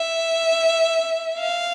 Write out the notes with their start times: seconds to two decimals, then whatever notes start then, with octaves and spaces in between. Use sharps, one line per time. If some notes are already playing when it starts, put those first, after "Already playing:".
Already playing: E5
1.39 F5